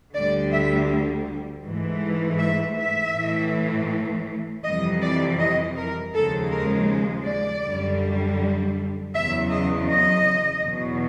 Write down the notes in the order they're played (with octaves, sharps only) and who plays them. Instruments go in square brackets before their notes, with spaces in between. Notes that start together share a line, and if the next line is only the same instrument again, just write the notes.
[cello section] D2 D3 G3 D5
E5
G#2 E3 A3
E5
E5
A2 E3 A3
F2 C3 E3 G3 D#5
D5
D#5
A#4
D#2 C#3 F3 G#3 A4
A#4
D5
F#2 D3 G3
E2 C#3 F#3 E5
D#5
D#5
E2 B2 F#3